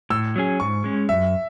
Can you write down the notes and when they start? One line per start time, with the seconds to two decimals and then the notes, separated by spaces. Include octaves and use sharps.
0.10 A2 E6
0.36 F#3 C#4 G#4
0.60 G#2 C#6
0.84 G#3 C#4
1.09 F#2 E5